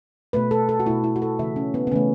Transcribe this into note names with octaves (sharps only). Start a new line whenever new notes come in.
B2 A3 B4
A4
A4
F#4
B2 A3 E4
E4
F#4
A4
C#3 E3 A3 E5
C#4
B3
B3
C#3 E3 A3 C#4